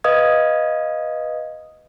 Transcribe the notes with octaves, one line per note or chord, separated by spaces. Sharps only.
B4 D#5 F5 D#6 G#6